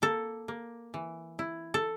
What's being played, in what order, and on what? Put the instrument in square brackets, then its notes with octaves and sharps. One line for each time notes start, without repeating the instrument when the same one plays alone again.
[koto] A#3 A4
A#3
E3
E4
A4